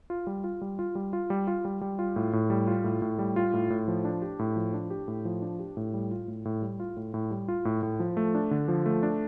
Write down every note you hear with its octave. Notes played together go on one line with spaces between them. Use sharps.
F4
G3
F4
G3
F4
G3
F4
G3
F4
G3
G3
F4
A2
A2
G3
F4
A2
A2
G3
F4
A2
A2
F3
D4
G4
A2
F3
D4
G4
A2
F3
D4
G4
A2
G3
F4
A2
A2
G3
F4
A2
A2
G3
F4
A2
A2
F3
A3
D4
D3
F3
A3
D4